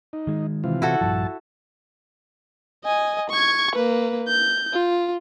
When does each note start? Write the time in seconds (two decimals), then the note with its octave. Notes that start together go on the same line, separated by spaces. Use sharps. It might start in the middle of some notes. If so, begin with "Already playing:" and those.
0.13 D#4
0.27 D#3 G#3
0.64 C3 E3 F4
0.82 E4 F#4 A4
1.01 A#1 G2 F3 A5
2.84 D#5 G#5
3.30 C#6 G#6
3.75 A#3 B4
4.28 G6
4.73 F4